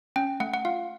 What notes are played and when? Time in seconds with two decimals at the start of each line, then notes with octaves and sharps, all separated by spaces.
0.16 C#4 G5
0.40 A3 F#5
0.54 F#5
0.65 F4 F5